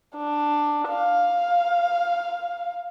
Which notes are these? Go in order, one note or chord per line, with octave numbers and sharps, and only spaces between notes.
D4
F5